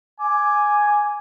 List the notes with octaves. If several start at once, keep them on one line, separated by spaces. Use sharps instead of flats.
G#5 D6